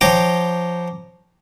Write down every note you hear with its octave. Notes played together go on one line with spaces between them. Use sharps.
F3 C#5 G5 A#5 D6